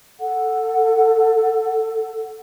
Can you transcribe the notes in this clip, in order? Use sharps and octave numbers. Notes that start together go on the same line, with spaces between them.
A4 F#5